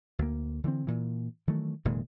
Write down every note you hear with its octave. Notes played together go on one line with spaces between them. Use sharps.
D2 A#3
D3 E3 A3 C4
A#2 E3
D#3 E3 F#3 A3
F1 A#2 D#3 G#3